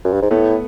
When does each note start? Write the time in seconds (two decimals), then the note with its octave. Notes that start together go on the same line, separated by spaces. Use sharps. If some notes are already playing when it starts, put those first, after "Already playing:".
0.05 F#2
0.13 G2
0.22 G#2
0.31 A2 A3 B3